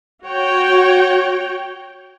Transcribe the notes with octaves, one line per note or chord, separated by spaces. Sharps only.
F#4 C#5 G5